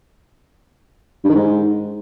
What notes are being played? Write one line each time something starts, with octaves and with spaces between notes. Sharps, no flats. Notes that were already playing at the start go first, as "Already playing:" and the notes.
G2
D#3
G#2